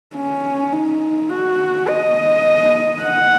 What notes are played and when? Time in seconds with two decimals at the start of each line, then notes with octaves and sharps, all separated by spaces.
0.15 C#4
0.73 D#4
1.30 F#4
1.88 D#5
3.03 F#5